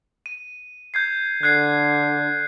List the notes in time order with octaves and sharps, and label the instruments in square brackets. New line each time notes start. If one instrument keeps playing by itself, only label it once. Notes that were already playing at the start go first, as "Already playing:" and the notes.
[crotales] D#7
G6 G#6 C7
[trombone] D3 [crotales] F#6 G#6 C7